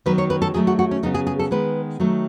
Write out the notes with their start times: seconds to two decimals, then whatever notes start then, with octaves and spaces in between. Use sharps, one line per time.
0.06 D#3 F#3 B3 B4
0.18 C#5
0.30 B4
0.42 A4
0.54 D#3 F#3 A3 G#4
0.67 F#4
0.79 F#4
0.91 C#4
1.03 C#3 F#3 B3 D#4
1.14 G#4
1.27 G#4
1.39 A4
1.51 D#3 G#3 B3 B4
2.00 D#3 F#3 A3